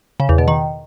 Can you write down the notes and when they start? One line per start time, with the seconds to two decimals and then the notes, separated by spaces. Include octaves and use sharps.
0.20 C#3
0.29 E2
0.38 B2
0.48 D#3